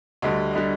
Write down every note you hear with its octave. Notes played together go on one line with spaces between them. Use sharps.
D2 D3 G3 D#5
D#5
D3 G3